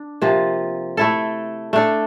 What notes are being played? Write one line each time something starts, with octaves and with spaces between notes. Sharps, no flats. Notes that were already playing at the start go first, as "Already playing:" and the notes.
Already playing: D4
C3 F3 A#3 F4
A3 E4 A4
A3 D4 A4